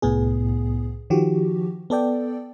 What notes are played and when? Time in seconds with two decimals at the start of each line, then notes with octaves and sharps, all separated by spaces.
0.02 C2 A2 B3 G#4
1.10 D#3 F3 F#4 G4
1.90 B3 A4 D5 G5